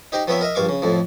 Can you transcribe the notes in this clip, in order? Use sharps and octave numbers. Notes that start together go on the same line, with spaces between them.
D#4 G4 C5 G5 A#5
F3 B3 C4 B4 C#5 E5
A#4 D#5 E5
A#1 G2 F5 C#6 D6
C#3
F2 A2 F3